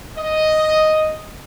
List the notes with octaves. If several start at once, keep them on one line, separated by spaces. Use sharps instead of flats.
D#5